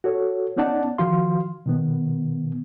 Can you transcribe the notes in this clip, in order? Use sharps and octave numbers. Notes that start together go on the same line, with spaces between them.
F#4 A4 C#5
B3 C#4 D#4 D5 F#5 A5
D#3 F3 F#4 F5 C6
B2 D#3 B3